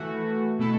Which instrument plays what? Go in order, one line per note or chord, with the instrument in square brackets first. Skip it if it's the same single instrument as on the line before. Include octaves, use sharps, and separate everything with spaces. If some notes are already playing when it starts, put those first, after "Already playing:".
Already playing: [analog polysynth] E3 A3 F#4
B2 A3 E4 A4